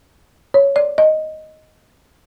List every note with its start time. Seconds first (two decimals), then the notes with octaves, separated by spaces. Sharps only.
0.54 C#5
0.76 D5
0.98 D#5